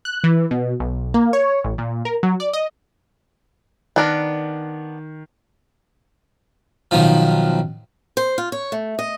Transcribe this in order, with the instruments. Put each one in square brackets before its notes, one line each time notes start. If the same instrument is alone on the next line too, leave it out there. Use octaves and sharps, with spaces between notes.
[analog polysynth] F#6
E3
B2
B1
A#3
C#5
A1
A#2
A#4
F#3
D5
D#5
[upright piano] D#3 [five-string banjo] B3 D4 A#4
[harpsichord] B1 D#3 F3
[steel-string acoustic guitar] C5
F4
C#5
A3
D#5